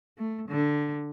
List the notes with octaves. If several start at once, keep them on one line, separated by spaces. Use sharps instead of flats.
A3
D3